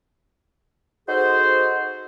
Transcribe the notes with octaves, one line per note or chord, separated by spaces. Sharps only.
D#4 F#4 G#4 A4 C5